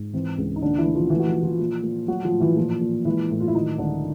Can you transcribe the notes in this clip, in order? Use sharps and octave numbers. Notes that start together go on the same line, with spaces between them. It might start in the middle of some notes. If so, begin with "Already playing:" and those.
Already playing: G#2
E3 C4
C#2
D#4
A#2 D3 D4
E3 E4
A#2
F3 F4
E3 A3 E4
F#4
F3 F4
A#2
F3 F4
A#2
A#2
F#3 A3 F#4
F3 F4
A2
E3 E4
A#2 F3 F4
A#2
E3 G#3 E4
A2
F4
E4
D#3 F#3 D#4
C#2 D3 D4